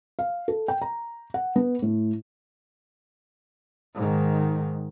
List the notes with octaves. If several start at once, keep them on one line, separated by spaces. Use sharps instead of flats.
F5
A4
G5
A#5
F#5
B3
A2
G#2 D#3